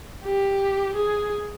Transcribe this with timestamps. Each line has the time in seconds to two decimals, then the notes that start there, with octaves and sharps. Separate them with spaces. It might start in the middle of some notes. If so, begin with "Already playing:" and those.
0.24 G4
0.95 G#4